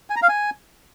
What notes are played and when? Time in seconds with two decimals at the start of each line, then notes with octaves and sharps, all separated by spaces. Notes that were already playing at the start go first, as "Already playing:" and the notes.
0.10 G#5
0.16 A#5
0.22 F5
0.29 G#5